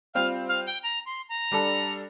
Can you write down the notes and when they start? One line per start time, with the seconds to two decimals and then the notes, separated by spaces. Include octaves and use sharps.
0.14 G3 C4 F4 F5
0.48 F5
0.66 G5
0.83 A#5
1.06 C6
1.29 A#5
1.52 G3 D4 A4